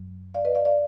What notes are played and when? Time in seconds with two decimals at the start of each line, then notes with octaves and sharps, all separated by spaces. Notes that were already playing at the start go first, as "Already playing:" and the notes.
Already playing: F#2 F#3
0.34 D5 F5
0.45 B4 D#5
0.55 D5 F5
0.65 D5 F5